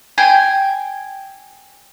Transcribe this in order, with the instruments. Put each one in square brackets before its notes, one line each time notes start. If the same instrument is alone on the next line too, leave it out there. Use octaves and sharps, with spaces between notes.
[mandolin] G5 G#5